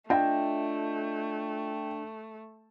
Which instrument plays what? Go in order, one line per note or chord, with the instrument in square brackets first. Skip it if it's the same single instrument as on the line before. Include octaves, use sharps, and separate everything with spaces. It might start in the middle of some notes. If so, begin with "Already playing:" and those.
[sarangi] A3 [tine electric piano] D4 [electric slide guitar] F4 D#5 E5 [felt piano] G5